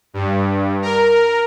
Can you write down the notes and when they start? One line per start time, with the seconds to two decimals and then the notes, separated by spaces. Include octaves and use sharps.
0.14 G2
0.82 A#4